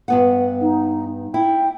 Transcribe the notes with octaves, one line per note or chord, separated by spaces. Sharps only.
G2 B3 F#5
D#4
E4 G5